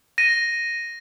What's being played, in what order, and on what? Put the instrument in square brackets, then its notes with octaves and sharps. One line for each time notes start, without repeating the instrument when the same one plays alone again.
[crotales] A#6 D#7